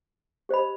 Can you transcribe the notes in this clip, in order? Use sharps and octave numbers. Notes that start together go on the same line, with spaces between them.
G4 C5 D#5 B5